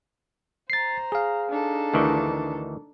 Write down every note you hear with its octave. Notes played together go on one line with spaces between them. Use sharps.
C5 A#5 A6 C7
G#4 F5
D4 D#4 A4
D2 D#3 E3